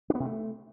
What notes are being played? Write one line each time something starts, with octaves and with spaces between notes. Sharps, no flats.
D4
B3
C3
A3